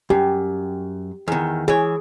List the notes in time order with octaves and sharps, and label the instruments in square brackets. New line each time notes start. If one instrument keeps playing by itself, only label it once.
[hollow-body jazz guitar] F#2 [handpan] G4
[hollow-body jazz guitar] E2 D#3
[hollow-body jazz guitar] E3 C#5 [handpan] G#4